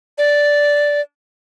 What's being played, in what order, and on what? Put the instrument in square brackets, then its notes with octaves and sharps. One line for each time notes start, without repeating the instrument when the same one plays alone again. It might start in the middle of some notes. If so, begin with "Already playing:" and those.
[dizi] D5